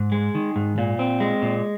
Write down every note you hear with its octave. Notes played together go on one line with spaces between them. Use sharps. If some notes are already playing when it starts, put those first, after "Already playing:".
Already playing: G#2
G#3
D#3
G#2
A#2
C4
G#3
A#2